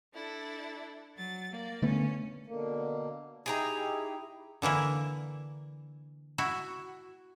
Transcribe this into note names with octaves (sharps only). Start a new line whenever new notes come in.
D4 E4 A4
F#3 A6
A#3 D5
D3 A3 B3 C#4
B2 D3 A#3
D#4 E4 G4 G#4 G5 A#5
D3 E3 A#3 E4
E4 F#4